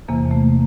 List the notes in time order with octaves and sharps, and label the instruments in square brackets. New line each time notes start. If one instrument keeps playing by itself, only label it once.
[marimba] E2 C3 E3 A#3
A3